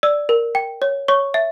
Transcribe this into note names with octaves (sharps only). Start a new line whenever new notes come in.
D5 E6
A#4
G5
C#5
C#5 C#6
E5